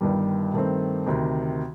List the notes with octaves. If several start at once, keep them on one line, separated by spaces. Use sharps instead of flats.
G1 G2 D#3 G3
G2 D#3 A3 C4
D2 C3 D#3